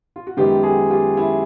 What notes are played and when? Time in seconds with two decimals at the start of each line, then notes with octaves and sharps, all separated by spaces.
0.16 F4
0.27 F#4
0.37 F#2 D#3 G#3 B3 F4 G4
0.63 F#4 G#4
0.90 F4 G4
1.17 E4